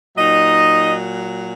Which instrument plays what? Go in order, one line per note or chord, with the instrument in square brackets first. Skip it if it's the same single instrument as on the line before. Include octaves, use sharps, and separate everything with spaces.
[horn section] A#2 F#3 D#4 D#5